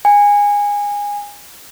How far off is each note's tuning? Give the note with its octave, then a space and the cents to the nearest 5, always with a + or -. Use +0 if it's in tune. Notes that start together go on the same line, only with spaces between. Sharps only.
G#5 -20